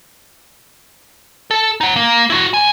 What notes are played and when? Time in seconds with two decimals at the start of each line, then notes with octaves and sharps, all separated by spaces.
1.51 A4
1.81 D#4 F#5
1.96 A#3
2.30 E4 F#4
2.54 D2 G#5